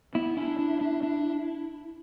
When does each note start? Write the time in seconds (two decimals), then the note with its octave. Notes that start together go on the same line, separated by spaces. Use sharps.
0.15 B3 E4
0.37 D4 E4
0.58 D4
0.81 D4
1.03 D4